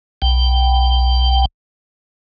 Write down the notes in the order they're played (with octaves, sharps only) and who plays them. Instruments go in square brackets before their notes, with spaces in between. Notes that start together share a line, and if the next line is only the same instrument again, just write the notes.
[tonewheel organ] B1 G5